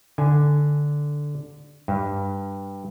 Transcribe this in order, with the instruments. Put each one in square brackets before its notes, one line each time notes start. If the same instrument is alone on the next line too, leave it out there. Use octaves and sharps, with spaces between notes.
[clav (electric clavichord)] D3 G#5
G2